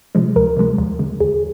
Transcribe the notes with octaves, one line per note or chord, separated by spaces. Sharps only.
C3 F3 G#3
D2 A#4
C3 F3 G#3
D#2
D3 G#3
D#2 G#4